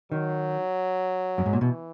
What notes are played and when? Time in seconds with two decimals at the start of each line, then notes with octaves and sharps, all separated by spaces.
0.12 D#3 F#3
1.38 F#2
1.46 G#2
1.53 A#2
1.61 B2 E3